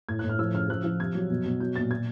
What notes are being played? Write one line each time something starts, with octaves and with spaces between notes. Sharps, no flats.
A2 G#6
F#6
A2
F6
F3 E6
C#3 F6
F3 F#6
F3
C3 G#6
F#3
B2
B2
F#3 G6
A#2 A6
A#2 G#6